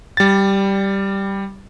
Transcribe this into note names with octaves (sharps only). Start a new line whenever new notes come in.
G3 A6